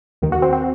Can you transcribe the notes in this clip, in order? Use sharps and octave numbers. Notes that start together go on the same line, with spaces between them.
D#2 D#3
F#4
C4
C4